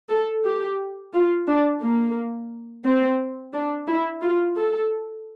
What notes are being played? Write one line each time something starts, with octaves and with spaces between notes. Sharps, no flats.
A4
G4
F4
D4
A#3
C4
D4
E4
F4
A4